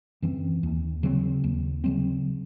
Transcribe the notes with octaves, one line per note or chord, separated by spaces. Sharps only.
F#2 E3 C4
D#2
C#3 F#3 C4
D#2
C#3 F#3 C4